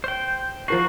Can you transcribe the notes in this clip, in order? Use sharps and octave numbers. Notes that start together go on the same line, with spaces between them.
C5 G5
F3 F#4 A#4 C7